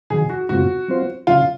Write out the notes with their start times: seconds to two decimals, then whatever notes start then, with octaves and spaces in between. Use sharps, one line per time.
0.10 C3 D#3 F#3 G#4
0.30 F#4
0.49 F#2 C#3 G#3 C4 F4 F#4
0.88 F#3 C4 F4 C5
1.27 C#3 F#3 C#4 F4